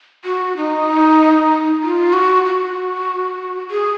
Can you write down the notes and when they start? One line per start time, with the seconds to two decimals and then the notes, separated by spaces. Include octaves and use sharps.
0.24 F#4
0.57 D#4
1.83 F4
2.13 F#4
2.45 F#4
3.70 G#4